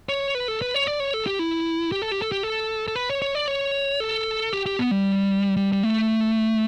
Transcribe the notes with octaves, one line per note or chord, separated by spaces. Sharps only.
C#5
B4
A4
B4
C#5
D5
C#5
A4
G4
E4
G4
A4
G4
A4
G4
A4
A4
B4
C#5
C#5
D5
C#5
A4
G4
G4
B3
G3
G3
G3
A3